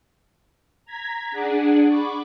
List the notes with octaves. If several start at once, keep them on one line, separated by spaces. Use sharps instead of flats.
A#5 G#6 B6
D4 G#4 D5 F#5
B5 C#6 D6